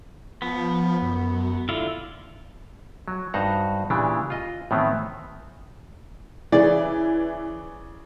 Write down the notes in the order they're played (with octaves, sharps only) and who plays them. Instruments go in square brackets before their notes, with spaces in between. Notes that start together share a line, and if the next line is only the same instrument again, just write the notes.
[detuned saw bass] F3 [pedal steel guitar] B3
[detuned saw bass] F#2
[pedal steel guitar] D3 E4 F4
[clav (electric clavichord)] F#3
G2 D#4 F#4 C5 F#5 A#5
A#2 C#3 E3 D4 G4
F4 D#5
A2 D#3 E3 B3 C4
[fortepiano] C#3 D5 [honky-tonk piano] E3